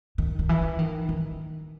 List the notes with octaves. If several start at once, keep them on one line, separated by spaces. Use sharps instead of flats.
D#3
D#3
E3
D#3
D#3